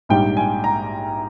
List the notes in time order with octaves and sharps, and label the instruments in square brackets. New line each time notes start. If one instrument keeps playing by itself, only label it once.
[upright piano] A#1 G#2 G3 G5
G#5
A#5